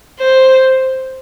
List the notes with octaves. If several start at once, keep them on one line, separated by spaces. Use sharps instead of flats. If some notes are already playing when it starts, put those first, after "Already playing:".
C5